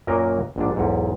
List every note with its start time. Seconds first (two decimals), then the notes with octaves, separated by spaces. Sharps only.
0.07 F#2 A#2 F#3 A#3 A#4 D#5
0.56 A#1 G#2 D4
0.76 B1 E2 G#2